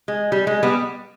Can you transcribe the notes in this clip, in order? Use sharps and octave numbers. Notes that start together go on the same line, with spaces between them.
G#3
G3
G#3
G3 B3